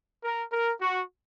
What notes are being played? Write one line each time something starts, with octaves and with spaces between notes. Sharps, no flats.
A#4
A#4
F#4